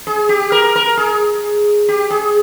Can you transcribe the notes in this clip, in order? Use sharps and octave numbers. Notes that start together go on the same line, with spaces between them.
G#4
G4
A#4
A#4
G#4
G4
G#4